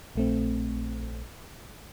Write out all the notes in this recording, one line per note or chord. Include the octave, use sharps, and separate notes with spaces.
A#1 A3 C4